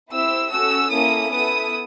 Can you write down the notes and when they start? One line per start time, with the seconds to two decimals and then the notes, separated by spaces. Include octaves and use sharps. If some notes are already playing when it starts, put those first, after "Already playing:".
0.11 C4 E4 G4 E6
0.51 C#4 F#4 A4 E6
0.90 A#3 C#4 E4 A4 D#6
1.31 B3 E4 A4 D#6